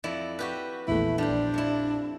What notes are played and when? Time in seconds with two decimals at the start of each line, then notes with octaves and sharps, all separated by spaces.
0.04 F2 E4 D5
0.39 F#4 G4 B4
0.88 A#1 E2 A3 E4
1.18 G3 D4 C5
1.29 A#1
1.54 F2 E4